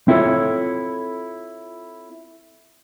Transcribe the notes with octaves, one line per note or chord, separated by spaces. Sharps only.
C4 E4 F4 A4 C#5